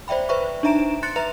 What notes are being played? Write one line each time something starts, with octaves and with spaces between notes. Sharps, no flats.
C5 D5 E5 G5 B5
B4 C5 E5 C#6
D4 D#4 E5 A#5 D7 E7
C6 F#6 A6 C#7
B4 E5 A#5 F7